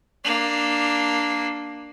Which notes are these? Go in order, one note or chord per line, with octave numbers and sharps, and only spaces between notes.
A#3 D4